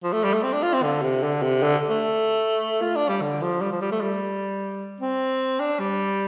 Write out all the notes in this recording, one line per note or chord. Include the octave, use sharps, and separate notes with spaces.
F3
A3
G3
A3
C4
D4
F4
C4
D3
C3
D3
C3
D3
A3
F4
D4
G3
D3
F3
G3
F3
G3
A3
G3
C4
D4
G3